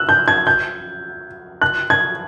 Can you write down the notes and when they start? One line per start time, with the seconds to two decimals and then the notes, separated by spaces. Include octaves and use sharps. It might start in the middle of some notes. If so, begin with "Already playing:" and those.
Already playing: E6 F#6
0.09 G6
0.28 G#6
0.47 G6
1.62 F#6
1.90 G#6